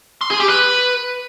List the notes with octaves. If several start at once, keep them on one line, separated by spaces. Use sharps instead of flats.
C6
G#4
G4
B4